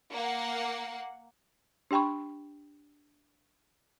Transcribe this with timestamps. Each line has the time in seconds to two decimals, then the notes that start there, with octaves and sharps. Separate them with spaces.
0.12 A#3 F#5
1.91 D4 G4 G5 B5 C#6